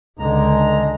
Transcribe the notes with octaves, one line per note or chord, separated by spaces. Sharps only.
C#2 D3 G#3 A#5